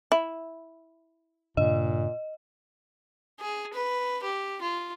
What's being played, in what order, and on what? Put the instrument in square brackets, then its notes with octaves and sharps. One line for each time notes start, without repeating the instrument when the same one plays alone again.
[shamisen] E4
[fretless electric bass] G2 C#3 D4 [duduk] A#2 [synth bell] D#5
[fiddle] G#4
B4
G4
F4